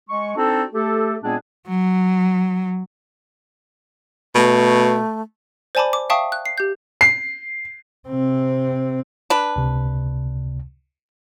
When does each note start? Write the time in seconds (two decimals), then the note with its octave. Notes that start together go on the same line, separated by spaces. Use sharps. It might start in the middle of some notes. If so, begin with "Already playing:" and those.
0.09 G#3 C#6
0.36 C4 D4 D#4 F#4 A4
0.73 A3 G4 A4
1.23 A#2 G#3 B3 C4 D4 G#4
1.68 F#3
4.35 B2 A3
5.75 C5 D5 G#5 A5 B5 D6
5.93 D6
6.10 E5 F5 G5 A5 C#6 D#6
6.32 F#6
6.46 C7
6.58 G4 G6
7.01 C7
8.08 C3 C4
9.30 D4 B4
9.56 C#2 C3